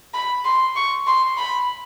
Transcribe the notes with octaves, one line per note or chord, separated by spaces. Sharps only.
B5
C6
C#6
C6
B5